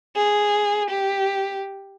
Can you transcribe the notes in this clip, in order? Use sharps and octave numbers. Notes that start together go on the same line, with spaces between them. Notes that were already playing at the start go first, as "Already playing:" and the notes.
G#4
G4